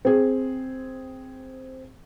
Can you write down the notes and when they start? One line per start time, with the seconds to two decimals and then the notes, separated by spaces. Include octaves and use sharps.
0.05 C4 G#4